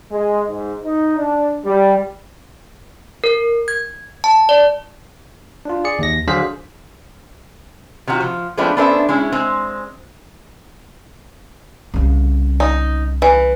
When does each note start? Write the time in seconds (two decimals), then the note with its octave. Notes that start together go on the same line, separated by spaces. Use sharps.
0.12 G#3
0.48 G#2
0.84 D#4
1.17 D4
1.65 G3
3.24 A#4
3.68 G#6
4.24 A5
4.49 D5
5.65 D4 F4
5.84 G#4 D5 C#7
5.99 D#2 A#6
6.28 D3 F#3 G#4 C5 F5 B6
8.08 C3 D#3 F4 F#4
8.20 F3
8.57 F3 G#3 A3 B3 C4 D4
8.77 B3 C#4 D4 A4 C5 E5
9.09 G#3 C#4 E4
9.32 G#3 C4
11.94 C2 C#3
12.60 D#4
13.22 E3